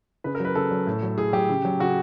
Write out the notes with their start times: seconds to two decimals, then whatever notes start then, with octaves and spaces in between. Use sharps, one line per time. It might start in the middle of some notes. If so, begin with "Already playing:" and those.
0.24 C#3 B4
0.35 A#4
0.40 F#3 B4
0.55 C#3 A4
0.71 F#3
0.87 A2
1.03 F#3
1.18 A2 G#4
1.33 F#3 G4
1.49 C#3
1.65 F#3
1.80 C#3 F#4